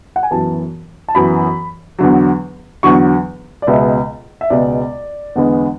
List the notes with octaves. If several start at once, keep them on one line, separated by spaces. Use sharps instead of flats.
F#5
G#5
F#2 E3 B3 A5
A5
F#2 E3 B3 B5
E2 D3 F#3
E2 D3 F#3 C#6
D5
C#2 B2 G#3 B3 E5
E5
C#2 B2 G#3 B3 D5
E2 D3 G#3 B3